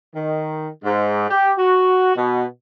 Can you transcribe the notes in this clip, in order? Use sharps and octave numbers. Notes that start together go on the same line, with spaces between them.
D#3
G#2
G4
F#4
B2